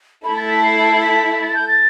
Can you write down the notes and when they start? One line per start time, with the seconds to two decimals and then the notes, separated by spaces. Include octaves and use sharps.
0.23 A3 E4 A4 B5
0.37 A6
0.50 B6
0.63 C7
1.02 B6
1.42 A6
1.55 G6
1.68 A6